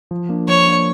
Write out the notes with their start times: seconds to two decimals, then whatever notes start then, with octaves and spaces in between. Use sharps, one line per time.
0.11 F3
0.29 A#3 D4
0.48 F3 C#5
0.67 A#3 D4